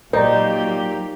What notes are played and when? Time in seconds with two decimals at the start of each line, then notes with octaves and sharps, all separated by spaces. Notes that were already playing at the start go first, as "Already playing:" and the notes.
0.13 A#2 F#3 A#3 D#4 G4 C5 D5 A#5